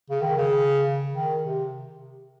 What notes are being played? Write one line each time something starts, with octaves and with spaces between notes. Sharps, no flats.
C#3
D#3
C#3
D#3
C3